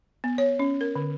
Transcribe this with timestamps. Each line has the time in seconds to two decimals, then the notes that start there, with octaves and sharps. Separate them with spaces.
0.24 B3
0.38 C#5
0.59 C#4
0.81 A#4
0.96 D3